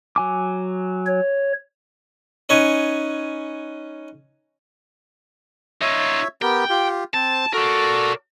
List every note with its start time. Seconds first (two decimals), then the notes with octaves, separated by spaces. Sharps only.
0.16 F#3 G#5 D6
1.06 C#5
2.49 C#4 D#4 B4 C#5 G#5
5.82 D#4 F4 C#5 E5
6.42 B3 G4 A#4 G5
6.70 F4 G4
7.14 C4 C5 A5
7.53 F#4 A4 A#4 D5